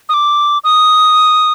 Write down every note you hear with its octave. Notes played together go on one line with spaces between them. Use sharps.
D#6
D6
D#6